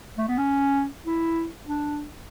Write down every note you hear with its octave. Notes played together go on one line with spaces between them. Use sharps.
A3
B3
C#4
E4
D4